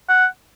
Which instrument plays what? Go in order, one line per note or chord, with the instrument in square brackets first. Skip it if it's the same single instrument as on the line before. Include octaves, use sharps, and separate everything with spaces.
[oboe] F#5